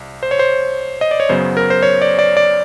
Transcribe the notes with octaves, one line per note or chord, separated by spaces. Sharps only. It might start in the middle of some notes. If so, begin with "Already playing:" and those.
Already playing: C2
C5
C#5
C5
D#5
D5
C#5
F#2 C#3 F#3 B3 C5
A#4
C5
C#5
D5
D5
D5